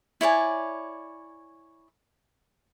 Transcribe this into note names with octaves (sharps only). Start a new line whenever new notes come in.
E4 C#5 D5 G#5